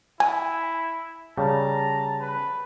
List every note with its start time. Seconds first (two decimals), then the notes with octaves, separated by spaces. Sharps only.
0.20 E4 G#5
1.37 C#3 G3 A5 A#5
2.21 B4